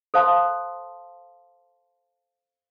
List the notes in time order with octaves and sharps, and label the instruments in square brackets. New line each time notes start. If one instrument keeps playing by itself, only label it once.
[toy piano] A4 C5 F5 A5 C6